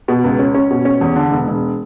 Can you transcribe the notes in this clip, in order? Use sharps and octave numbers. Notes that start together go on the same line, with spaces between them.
B2
C#2
C#4
C#4
B2
C#4
E2
D3
E1
E1